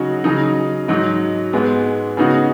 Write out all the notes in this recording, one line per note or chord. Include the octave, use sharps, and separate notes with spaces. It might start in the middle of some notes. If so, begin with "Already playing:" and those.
Already playing: C#3 F#3 D#4 F#4
C#3 F#3 D#4
G#2 F#3 D#4
G#2 G#3 B3
C#3 B3 D#4 F#4